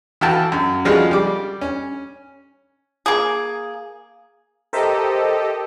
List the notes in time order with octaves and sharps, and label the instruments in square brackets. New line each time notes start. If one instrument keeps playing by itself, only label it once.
[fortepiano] E3 F#4 F5 G5 A5
F#2
C#3 F3 G3 G#3 F4 F#4
G3 D6
C#4
[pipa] A#3 G#4
[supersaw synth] G4 A4 D#5 [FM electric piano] A#4 C5 E5